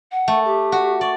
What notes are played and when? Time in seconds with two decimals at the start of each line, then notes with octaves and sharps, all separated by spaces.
0.11 F#5
0.28 A3
0.45 G4
0.72 F#4
1.01 D5 C#6